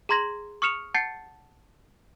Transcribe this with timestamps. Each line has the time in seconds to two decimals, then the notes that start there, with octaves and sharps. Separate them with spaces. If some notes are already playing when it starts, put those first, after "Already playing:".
0.09 G#4 A#5 C6 G#6 A#6 F#7
0.62 C#6 D#6 F6 C#7 E7 F7
0.94 F#5 A5 G6 A6 C7 C#7